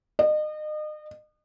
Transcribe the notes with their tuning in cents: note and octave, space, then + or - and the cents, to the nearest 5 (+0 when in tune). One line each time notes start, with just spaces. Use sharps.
D#5 -35